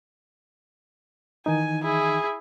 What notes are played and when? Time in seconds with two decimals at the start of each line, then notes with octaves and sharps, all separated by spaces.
1.46 D#3 E3 D#4 G#5
1.82 E4 G#4